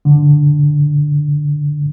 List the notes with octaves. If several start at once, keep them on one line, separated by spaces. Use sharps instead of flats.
D3